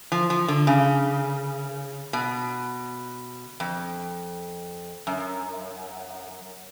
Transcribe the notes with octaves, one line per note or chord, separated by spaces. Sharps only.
F3
F3
D3
C#3
B2
F2
F#2